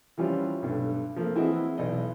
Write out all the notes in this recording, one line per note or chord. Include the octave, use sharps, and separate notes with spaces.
E3 F3 G3 C#4 F4
B1 G2 A3
F3 A3 A#3
E3 C4 E4 F#4 G#4 D#5
B1 E2 D5 D#5